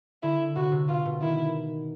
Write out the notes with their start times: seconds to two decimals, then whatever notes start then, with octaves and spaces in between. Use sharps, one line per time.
0.23 D3 E4
0.56 C3 F#4
0.72 C3
0.88 B2 F4
1.06 B2
1.21 D#3 E4